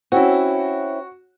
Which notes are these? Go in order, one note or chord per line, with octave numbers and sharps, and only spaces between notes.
C4 C#4 E4 F#4